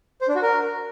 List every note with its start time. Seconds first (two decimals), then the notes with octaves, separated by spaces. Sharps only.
0.21 C5
0.28 D4
0.35 F#4
0.42 A#4